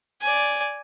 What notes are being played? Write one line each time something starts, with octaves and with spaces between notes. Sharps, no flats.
D5 G#5